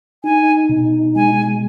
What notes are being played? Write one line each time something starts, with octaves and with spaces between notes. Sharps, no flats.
D#4 G#5
B2
G#3 G#5